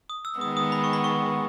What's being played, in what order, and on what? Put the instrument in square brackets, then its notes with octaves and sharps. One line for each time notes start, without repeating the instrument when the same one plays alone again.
[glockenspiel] D#6
E6
[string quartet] D#3 G#3 B3 [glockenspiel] D#6
[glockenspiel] D#6
B5
C#6
B5
C#6